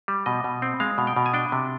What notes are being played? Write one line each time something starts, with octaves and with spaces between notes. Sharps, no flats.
G3
B2 D#5
B2
C4
G#3 F5
B2
G5
B2
G#5
D4 G5
C3